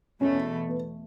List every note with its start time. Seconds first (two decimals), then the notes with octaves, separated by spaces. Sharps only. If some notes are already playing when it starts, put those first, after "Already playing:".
0.21 E2 B2 A3 C#4
0.68 B3